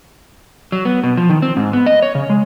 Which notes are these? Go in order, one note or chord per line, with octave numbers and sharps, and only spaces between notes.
F#3
B3
B2
F3
D#3
C4
G#2
B3
D#5
C#5
C#3
G#3